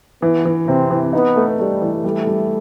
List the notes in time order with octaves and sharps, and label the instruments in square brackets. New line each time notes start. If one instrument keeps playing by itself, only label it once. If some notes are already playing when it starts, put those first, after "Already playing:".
[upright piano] E3 [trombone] B3
[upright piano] E3
[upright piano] C3 [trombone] C4
[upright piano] E3
[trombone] B3 [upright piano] D#4
[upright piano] A3
[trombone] G3 [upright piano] A3
[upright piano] E3
[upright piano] G3 [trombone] A3
[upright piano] G3